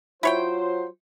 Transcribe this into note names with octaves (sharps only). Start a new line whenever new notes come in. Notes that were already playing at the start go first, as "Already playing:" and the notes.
F#3 E4 F4 C5 C#5 G5